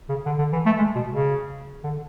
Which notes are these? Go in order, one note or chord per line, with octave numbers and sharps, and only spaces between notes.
C#3
D3
D3
E3
A3
G#3
B2
C#3
D3